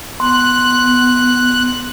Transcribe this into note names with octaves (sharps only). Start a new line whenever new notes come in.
B3 C6 F#6